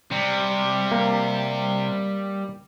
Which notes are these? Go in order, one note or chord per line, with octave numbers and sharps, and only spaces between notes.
C3 G3
A#3